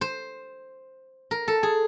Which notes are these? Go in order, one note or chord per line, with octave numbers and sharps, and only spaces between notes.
C5
A#4
A4
G#4